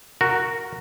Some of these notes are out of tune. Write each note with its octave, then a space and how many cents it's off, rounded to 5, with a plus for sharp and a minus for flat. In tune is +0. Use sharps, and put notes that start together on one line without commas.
F#4 +0 A#4 -5